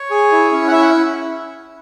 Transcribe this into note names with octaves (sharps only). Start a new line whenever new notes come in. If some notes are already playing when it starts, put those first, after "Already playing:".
Already playing: C#5
G#4
E4
C#4
F#5
E4 E5
F#5